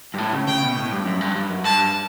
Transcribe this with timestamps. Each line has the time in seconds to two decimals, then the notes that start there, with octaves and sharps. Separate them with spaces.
0.14 G2
0.18 A2
0.32 C#3
0.47 C#3 G5
0.63 B2
0.76 A2
0.92 G2
1.06 F#2
1.21 G2
1.35 G2
1.50 F#2
1.64 G2 A5